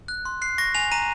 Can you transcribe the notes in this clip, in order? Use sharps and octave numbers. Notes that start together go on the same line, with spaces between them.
F#6
C6
F#6 C7
C#6 A#6
G#5 F7
A#5 D#7